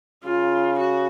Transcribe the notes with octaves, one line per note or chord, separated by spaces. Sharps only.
C#3 F4
F#4